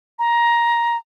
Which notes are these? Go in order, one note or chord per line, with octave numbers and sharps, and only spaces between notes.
A#5